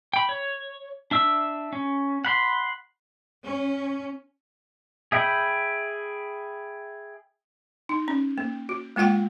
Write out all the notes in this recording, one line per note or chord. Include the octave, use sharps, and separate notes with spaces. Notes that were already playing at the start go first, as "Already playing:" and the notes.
G5 B5
C#5
D4 E5 E6
C#4
F#5 B5 C6
C#4
G#4 E5 G5 B5
D#4
C#4
A#3
F#4
G#3 A#3 F4 F#5 G5